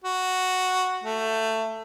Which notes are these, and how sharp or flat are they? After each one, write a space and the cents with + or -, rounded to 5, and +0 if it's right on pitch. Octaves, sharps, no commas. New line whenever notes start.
F#4 +0
A3 +15